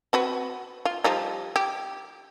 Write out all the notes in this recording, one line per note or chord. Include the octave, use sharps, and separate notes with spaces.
C4 F#4 B4
F4
F3 G3 D#4
G4